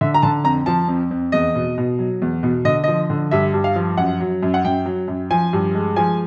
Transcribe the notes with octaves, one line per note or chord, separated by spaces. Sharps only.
D3 E5
A#5
D3 A5
F2 A#5
F3 A5
F2
F2
E2 D#5
B2
B2
F#3
E2
B2
D3 D#5
F3 D#5
D3
G2 E5
G2
F5
F3
F#2 F#5
F#3
F#2
F#5
F#2 G5
F#3
F#2
F3 G#5
G2
G#3
F3 G#5